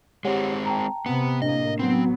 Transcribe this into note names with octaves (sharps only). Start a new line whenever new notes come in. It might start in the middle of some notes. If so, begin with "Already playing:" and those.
G#3 C4 G4 C#5 F#5
G5 A5 A#5
C3 B3
A2 A#3 D4 D#5
F#3 B3 C4